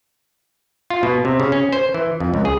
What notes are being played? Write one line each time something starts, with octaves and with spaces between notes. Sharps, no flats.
F4
B2
C3
C#3
C#4
C5
E3
F2
C#2
G#4